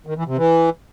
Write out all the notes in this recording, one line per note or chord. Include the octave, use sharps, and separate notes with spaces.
D#3
E3
C3
E3